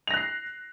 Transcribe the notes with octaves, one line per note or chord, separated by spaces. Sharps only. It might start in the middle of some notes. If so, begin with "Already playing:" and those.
F#6 A#6 C7 F7